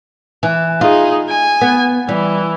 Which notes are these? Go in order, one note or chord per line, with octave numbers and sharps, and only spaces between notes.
E3
D#4 F4 G#4
G#5
B3
E3 G3